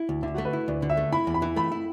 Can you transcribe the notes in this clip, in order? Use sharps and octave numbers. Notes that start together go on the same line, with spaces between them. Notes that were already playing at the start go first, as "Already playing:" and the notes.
Already playing: E4
D2
D3 E5
A3 F#4
B4
E4
D2 D5
D3
E5
A3
E4 B5
E2
B5
E3
A3 B5
E4